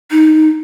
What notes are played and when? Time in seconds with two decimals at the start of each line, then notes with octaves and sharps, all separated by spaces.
0.11 D#4